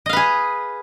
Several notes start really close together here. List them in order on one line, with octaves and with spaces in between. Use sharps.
D#5 F5 B4 G#4